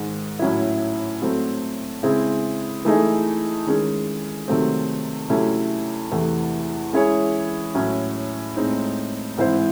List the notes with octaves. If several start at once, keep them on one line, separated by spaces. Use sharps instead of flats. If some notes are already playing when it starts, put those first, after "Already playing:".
Already playing: G#2 D#3 G#3
A2 F#3 C#4 E4
F#3 A3 C4
C#3 G#3 C4 E4 G#4
E3 A3 D#4 G#4 D#5
D#3 G#3 C#4 G#4
C3 D#3 F#3 A3 C4
C3 F#3 A3 C#4 E4
E2 C3 E3 A3
G#3 C#4 E4 G#4 C#5
A2 F#3 C#4 E4
A2 G#3 C4 D#4
G#2 E3 C4 E4 C5